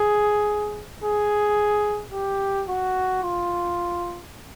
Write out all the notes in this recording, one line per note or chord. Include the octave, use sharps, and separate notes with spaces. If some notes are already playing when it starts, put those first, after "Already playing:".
Already playing: G#4
G#4
G4
F#4
F4